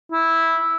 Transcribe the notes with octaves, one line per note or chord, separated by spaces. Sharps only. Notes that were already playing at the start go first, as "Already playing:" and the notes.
E4